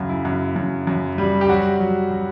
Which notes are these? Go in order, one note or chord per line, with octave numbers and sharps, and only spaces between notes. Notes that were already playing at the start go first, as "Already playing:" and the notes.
Already playing: F#2 C#3 F#4
E4
F#2
F#2
F#2
G3
G4
F#3 F#4
F#3
F#3